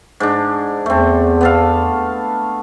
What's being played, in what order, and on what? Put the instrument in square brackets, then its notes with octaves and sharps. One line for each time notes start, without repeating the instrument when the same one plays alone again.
[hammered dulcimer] G#2 D4
[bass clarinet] E2 [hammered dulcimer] A3 C4
[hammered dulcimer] B3 A4 F5